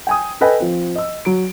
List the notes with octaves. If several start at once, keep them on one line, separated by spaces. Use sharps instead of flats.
G5 G#5 D#6
A4 B4 D#5 G5 G#5
F3 C4
D#5 E6
F#3 D7